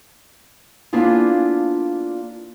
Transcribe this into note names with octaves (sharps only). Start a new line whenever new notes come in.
A#3 B3 D4 E4 F4 G#4